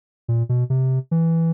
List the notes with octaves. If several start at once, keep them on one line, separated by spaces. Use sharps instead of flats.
A#2
B2
C3
E3